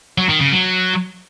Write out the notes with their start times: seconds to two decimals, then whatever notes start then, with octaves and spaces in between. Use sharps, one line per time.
0.18 F#3
0.29 D#3
0.41 C#3
0.52 F#3